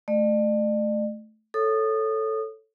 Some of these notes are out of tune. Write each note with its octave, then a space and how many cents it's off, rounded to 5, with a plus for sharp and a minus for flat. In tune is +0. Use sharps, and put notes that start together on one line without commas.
A3 -15 D5 +45
A4 +0 C#5 +0 D#6 -25